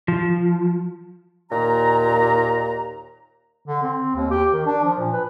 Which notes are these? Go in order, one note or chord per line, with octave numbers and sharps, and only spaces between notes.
F3
D#2 A#2 A#5
D3
C4
D#2
G4
D#3
D4
F3
A#2
B4